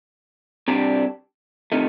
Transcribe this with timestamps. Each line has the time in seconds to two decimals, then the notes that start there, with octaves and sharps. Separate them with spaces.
0.68 C3 G3 D4
1.72 C3 D#3 A3